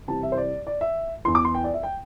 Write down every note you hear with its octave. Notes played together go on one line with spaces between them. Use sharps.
C2 C3 E3 A5
E5
C5
D5
D5
E5
E2 E3 C6
D6
C6
G5
D5
E5
G5